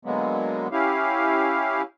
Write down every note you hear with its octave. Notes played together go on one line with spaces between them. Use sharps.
D3 F#3 G#3 A#3 B3
C#4 E4 G4 F5